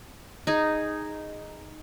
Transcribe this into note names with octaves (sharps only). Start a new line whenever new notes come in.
D#4 G#4